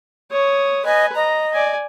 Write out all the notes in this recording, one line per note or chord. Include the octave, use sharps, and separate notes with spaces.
C#5 D#6
B4 D#5 G#5
D#5 A#5
D5 G#5